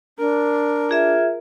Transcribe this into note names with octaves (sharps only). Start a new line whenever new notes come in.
D4 A#4
F4 G#4 E5